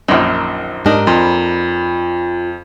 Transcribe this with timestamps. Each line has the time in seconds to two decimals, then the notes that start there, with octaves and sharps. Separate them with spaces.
0.08 A#1 F#2 D#3
0.86 G#2 D4 D#4 G4 A#4
1.07 F2 F4 B5 C6